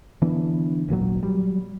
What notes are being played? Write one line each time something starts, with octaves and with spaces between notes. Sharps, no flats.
D3 E3 B3 D4
D#1 G#1 A#2 F#3
F#3 G3